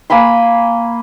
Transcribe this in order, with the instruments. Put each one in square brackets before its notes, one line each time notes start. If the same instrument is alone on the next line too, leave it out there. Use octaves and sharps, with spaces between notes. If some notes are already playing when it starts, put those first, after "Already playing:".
[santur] A#3 G#5 B5 C6